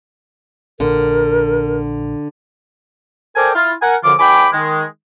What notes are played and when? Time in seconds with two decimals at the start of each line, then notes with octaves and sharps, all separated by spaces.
0.80 A#1 D3 A#4
3.36 A4 A#4 C5 D5 G5 G#5
3.55 E4 F4
3.82 A#4 F#5 G#5
4.04 F#2 D3 F3 F4 D6
4.19 D#2 G5 G#5 B5 D6
4.53 D#3 G#3